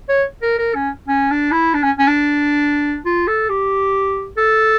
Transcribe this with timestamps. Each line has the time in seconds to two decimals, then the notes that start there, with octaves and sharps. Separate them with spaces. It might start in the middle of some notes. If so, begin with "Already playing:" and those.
0.09 C#5
0.42 A#4
0.59 A#4
0.75 C#4
1.08 C#4
1.31 D4
1.52 E4
1.74 D4
1.83 C#4
1.99 C#4
2.07 D4
3.06 F4
3.28 A4
3.49 G4
4.37 A4